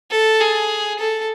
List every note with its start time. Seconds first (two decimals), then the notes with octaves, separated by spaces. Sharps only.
0.11 A4
0.40 G#4
0.99 A4